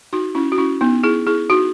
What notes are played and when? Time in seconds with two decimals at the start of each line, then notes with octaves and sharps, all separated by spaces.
0.13 D#4 F#4
0.35 C#4 E4
0.52 F#4
0.58 C#4 E4
0.81 B3 D#4
1.04 E4 G#4
1.27 E4 G#4
1.50 D#4 F#4